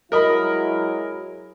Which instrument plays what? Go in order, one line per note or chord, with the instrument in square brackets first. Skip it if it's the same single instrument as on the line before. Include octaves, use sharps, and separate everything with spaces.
[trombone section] F#3 G#3 E4 [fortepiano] A#4 D#5 B5